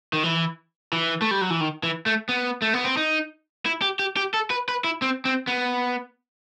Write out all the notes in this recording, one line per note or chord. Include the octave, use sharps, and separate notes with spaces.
D#3
E3
E3
A3
G3
F#3
E3
D#3
E3
A3
B3
A3
B3
C4
D#4
E4
G4
G4
G4
A4
B4
B4
E4
C4
C4
B3